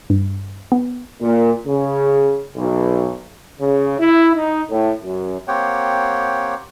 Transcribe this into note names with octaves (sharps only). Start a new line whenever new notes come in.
G2
B3
A#2
C#3
B1
C#3
E4
D#4
A2
F#2
A#3 C4 G4 C#5 F#5 G5